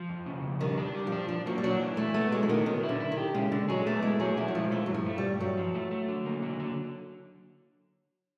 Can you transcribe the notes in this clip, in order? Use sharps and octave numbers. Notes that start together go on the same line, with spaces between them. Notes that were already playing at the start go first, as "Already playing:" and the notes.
Already playing: F3
F2
C#3
F2
D#3 G3
D4
G3
F3
D4
F3 D4
F#3 A#3
G3
F#3 D4
E3
A3 E4
A3 B3
F#3 G#3
E3
D#3 B3
D#3 F#3
E4
D3
E4
D#3
G4
C#3 G#3
D3 G#3
F#3 G#4
A3 B3
G#3 E4
F#3 G#4
F3 E4
F#3
F3 G#3
E3 A3
G2 F#3
F3
A3
G3
G2
G2 F#3
F3
A3
A3
D3
A#3
D3
D3